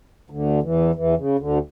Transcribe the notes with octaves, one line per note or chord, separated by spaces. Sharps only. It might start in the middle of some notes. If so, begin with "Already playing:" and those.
D2 D3
E2 E3
E2 E3
C#3
D2 D3